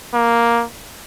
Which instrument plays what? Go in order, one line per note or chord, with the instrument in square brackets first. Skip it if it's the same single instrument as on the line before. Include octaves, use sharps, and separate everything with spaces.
[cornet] A#3